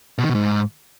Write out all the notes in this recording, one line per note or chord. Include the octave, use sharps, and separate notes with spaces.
B2
D#3
B2
G#2